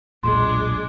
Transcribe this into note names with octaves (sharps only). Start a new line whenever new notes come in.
E1 B1 A#2 G#3 D4 C6